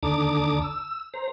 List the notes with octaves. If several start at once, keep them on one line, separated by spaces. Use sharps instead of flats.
D#2 D3 A5 A#5 D6 D#6
E6
C5 A#5